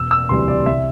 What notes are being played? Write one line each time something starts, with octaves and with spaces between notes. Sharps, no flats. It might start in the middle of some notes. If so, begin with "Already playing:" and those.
Already playing: E1 E6
E6
D2 C3 E3 G3 C6
D5
C2 E5